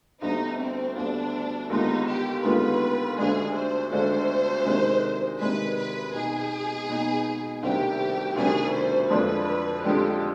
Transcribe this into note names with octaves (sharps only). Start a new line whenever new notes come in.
D2 D3 G3 B3 D#4
C4
D2 D3 G3 B3 D4
D#2 D3 G#3 B3 D#4 F4
G4
D#2 D3 G#3 B3 F4 B4
D2 D3 G#3 D4 G#4
C5
D2 D3 G#3 D4 C5
C3 D#3 G#3 D4
C3 D#3 G#3 D4 B4
B4
B2 B3 D#4 G#4
B2 B3 D#4
D2 C3 D#3 G3 D4 G4
D2 C3 D#3 G3 D4 G#4
C5
F2 D3 F3 G#3 D4 B4
F2 D3 F3 G#3 D4 G4